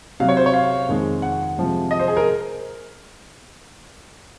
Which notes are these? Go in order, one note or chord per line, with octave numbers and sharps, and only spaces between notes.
C3 F#3 F5
C#5
C5
C#5
F5
F2 D#3 G#3
F#5
C3 F3 G#3
D#5
C5
G#4
A#4